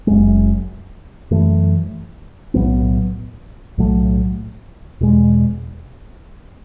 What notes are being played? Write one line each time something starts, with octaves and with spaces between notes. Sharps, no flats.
F#1 F#2 E3 G#3
F#2 E3 A3
B1 A2 F#3 B3
B1 A2 F#3 A3
E2 B2 G#3